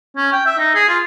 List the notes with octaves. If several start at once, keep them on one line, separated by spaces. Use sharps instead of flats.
C#4
G5
E5
D#4
G#4
F4